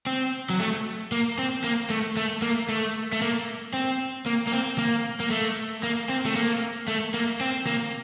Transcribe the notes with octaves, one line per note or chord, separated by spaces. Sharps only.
C4
F#3
A3
A#3
C4
A#3
A3
A3
A#3
A3
A3
A#3
C4
A#3
A#3
C4
A#3
A#3
A3
A#3
C4
A3
A#3
A3
A#3
C4
A#3